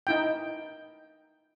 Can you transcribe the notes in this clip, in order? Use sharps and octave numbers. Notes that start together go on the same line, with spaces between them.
D#4 E4 G5